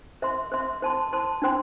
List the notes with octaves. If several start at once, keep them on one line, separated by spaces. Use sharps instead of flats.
C5 E5 C6
C5 E5 C6
C5 A5 C6
C5 A5 C6
D4 C5 G5 C6